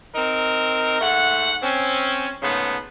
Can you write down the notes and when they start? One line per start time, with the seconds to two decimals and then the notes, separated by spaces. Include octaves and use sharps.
0.15 C4 D#4 A#4
1.01 G#2 A3 F#5
1.63 C4 C#4
2.43 G#2 C#3 A3 B3